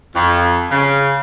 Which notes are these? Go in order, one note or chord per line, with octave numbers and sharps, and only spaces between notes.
F2
C#3